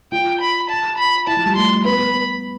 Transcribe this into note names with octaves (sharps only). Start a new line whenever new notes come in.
F4 G5
B5
A5
B5
E4 A5
F3
G3
A3 C6
B3 B5
B3
B3